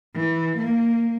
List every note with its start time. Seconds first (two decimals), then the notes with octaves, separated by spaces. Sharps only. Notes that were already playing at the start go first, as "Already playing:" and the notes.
0.15 E3
0.57 A#3